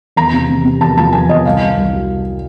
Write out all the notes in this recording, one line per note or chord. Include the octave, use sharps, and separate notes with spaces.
E2 A#5
C3
C3
C3
E2 A5
F3 A5
E2 G#5
E2 D#5
C2 F5
C2
C2
F#3